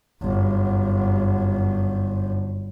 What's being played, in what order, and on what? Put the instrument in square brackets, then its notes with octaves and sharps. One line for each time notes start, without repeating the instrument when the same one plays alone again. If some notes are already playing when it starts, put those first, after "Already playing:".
[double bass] G1 F#2